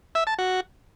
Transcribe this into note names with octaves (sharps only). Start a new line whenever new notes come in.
E5
A5
F#4